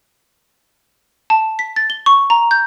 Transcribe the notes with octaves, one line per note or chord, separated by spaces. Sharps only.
A5
B6
A6
G7
C#6
A#5
G6